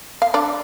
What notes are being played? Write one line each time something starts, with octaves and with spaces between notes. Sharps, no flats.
F5
D4 D5